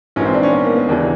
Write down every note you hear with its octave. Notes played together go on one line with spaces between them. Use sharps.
A#1 G#2 E3 C#4
C4
D4
C#4
B3
A#3
B3
D#2 C#3 E3 D4